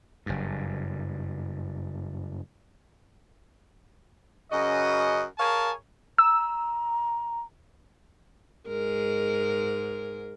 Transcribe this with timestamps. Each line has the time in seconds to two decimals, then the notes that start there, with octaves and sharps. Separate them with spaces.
0.26 F#1 G2
4.51 F#2 C#3 F#4 D#5
5.39 G#4 A#4 C#5 F5 G#5 A5
6.18 A#5 E6
8.68 G#2 G#3 A#4